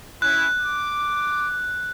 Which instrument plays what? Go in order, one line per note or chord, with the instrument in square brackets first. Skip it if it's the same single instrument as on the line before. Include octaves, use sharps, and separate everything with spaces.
[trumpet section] C#4 E4 [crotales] F#6
[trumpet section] D6